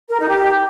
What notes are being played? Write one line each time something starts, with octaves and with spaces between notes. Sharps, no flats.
A#4
D#4
G4